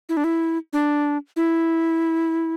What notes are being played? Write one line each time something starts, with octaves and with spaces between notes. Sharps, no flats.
E4
D4
E4
D4
E4